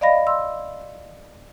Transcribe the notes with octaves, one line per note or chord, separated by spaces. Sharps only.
D5 D#5 F5 B5 A#6
C6 E6